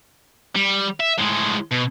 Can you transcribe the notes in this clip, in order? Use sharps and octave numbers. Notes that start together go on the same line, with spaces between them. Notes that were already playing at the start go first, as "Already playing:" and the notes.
G3
E5
A2 G#3
B2